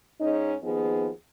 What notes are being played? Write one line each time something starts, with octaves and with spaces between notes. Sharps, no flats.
G#2 C#4 D#4
D#2 F3 B3 D#4 G#4